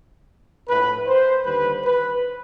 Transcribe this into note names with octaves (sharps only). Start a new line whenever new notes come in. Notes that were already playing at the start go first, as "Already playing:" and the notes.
A#1 A2 F3 B4
C5
D#2 D3 G3 B4
B4